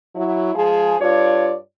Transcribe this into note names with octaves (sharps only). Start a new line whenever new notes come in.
F#3 E4
F3 G#3 G#4
G2 F4 C#5 D5